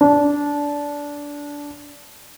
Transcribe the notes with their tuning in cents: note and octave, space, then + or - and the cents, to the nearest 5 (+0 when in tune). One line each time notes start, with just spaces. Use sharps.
D4 -15